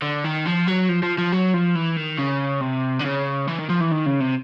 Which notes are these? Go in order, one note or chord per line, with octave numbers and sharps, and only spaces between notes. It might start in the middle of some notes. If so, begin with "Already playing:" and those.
D3
D#3
F3
F#3
F3
F3
F3
F#3
F3
E3
D#3
C#3
C3
D3
C#3
E3
D#3
F3
E3
D#3
C#3
C3